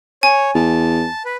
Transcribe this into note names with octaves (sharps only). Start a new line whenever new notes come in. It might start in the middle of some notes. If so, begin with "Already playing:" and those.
C#5 G#5
E2 A5
B4